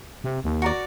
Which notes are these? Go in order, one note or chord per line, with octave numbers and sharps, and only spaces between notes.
C3
D#2
F#4 A#4 D5